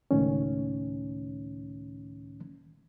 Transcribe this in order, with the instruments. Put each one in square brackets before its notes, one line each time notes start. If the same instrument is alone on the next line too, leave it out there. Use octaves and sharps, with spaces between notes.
[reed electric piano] C#2 A2 D#3 C#4